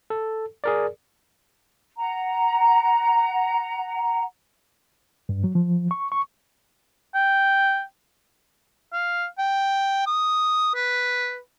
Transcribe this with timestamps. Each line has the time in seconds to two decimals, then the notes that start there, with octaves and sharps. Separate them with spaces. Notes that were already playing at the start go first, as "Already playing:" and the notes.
0.10 A4
0.64 G#4 A#4 D5
1.97 F#5 A#5
5.29 G2
5.44 F#3
5.55 F3
5.91 C#6
6.12 C#6
7.15 G5
8.93 F5
9.38 G5
10.07 D#6
10.75 B4